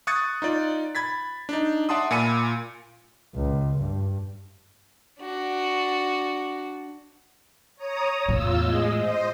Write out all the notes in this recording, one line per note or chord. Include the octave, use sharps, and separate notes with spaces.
C#6 D#6 F#6 G#6 A6 C#7
D#4 F4 D5
B5 G#6 A6 B6
D4 D#4
D5 E5 F#5 A5 C6 D#6
A#2 F4 G#5 B5 C#7 D#7
C#2
G2
D4 F#4
C#5 A#5 D#6
E2 A2 F4 E6
G#3 G#4 D#5
C5 D#5